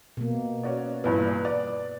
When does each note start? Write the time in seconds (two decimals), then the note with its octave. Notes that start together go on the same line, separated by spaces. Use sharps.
0.17 B2 A#3
0.63 C#4 F#4 D5
1.04 A#1 E2 G2 B4
1.45 D5